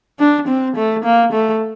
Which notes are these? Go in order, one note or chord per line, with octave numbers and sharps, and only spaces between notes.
D4
C4
A3
A#3
A3